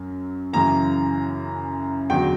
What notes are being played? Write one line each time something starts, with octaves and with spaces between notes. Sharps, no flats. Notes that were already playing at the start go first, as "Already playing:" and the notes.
Already playing: F#2 F#3
F#2 C#3 E3 A#5
E2 D3 F#3 G5